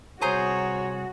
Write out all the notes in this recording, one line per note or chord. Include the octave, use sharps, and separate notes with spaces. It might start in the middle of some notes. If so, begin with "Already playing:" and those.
C2 F#4 G#4 C5 C#5 A#5 D#6